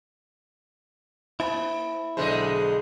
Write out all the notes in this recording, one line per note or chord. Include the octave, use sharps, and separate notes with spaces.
A#3 E4
B1 D3 G#3 B4 C5 D#5